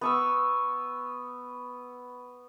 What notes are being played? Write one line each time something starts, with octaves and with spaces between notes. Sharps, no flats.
B3 C#6 E6